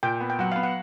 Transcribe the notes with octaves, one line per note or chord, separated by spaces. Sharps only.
A#2 G5
B3
G5
F#3 F#5
B3 F5
F#5